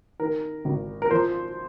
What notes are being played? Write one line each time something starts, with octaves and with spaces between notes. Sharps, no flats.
D#3 A#4
G#1
A#4
F3 C5